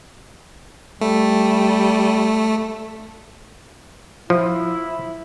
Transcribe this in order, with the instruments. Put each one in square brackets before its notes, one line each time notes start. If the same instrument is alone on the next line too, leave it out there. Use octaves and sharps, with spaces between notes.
[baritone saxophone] G3 [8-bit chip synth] A3
[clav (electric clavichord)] F3 [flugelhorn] E4